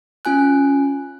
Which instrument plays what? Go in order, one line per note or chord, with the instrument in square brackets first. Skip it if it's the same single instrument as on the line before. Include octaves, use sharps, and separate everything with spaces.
[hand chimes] C#4 F4 G#5 F#6